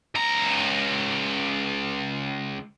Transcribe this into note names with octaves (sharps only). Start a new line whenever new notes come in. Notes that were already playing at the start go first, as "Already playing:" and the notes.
C#2 A#5